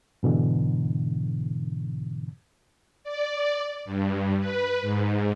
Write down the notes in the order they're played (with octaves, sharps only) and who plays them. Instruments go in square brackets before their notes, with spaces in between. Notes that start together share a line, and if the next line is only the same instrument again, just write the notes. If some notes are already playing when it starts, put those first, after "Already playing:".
[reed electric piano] G#2 B2 D3 E3
[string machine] D5
G2
B4
G#2